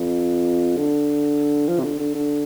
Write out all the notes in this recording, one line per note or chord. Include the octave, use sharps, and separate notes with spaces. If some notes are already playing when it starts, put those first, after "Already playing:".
Already playing: F2
D3
F3
C3
D3
D3
D3